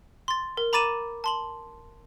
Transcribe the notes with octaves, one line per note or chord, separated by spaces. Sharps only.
C6 A6
A#4
A#5 B5 D6 A6 D#7 E7
A5 C6 F#7